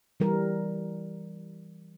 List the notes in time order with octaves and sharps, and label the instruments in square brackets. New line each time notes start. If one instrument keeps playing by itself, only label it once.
[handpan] E3 G3 A#4